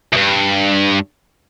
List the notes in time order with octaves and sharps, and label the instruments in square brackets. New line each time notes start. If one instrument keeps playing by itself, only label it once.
[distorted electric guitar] D2 G2